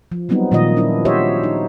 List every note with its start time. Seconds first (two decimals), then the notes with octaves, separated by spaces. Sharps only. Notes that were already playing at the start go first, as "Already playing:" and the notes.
0.12 F3
0.29 F#3 G3 B3 C4 D#4
0.52 A#2 D#3 F3 F4 D#5
0.77 C#4 D4 E4
1.05 F#4 G4 C5 C#5 D#5 E5
1.43 D#4